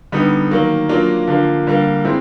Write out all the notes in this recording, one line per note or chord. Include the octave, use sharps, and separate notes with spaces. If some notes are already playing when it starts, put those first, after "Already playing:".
D3 G3 B3 D#4
D#3 F#3 A#3
F#3 A#3 D4 F4
D3 F3 A#3
D3 G3 A#3
G#3 C4 E4